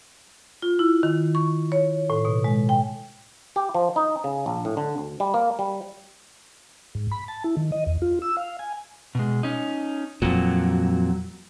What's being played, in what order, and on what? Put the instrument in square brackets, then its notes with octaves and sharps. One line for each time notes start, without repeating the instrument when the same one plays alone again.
[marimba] F4
E4
D#3
C#6
C#5
A2
B2
G#3
G5
[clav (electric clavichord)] G4
F3
D#4
C#3
A#1
A2
D3
D2
G3
A#3
G3
[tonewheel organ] G#2
B5
A5
E4
D#3
D#5
E2
F4
E6
F5
G#5
[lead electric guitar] B2 G#3
C#4 D#4
[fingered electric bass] F2 A#2 [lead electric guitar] F#3